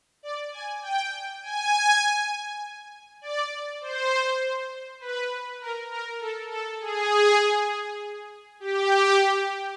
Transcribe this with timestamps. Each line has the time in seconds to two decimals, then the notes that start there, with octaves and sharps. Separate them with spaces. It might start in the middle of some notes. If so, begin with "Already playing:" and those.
0.23 D5
0.52 G#5
0.82 G5
1.43 G#5
3.21 D5
3.81 C5
5.01 B4
5.61 A#4
5.91 A#4
6.20 A4
6.51 A4
6.81 G#4
8.60 G4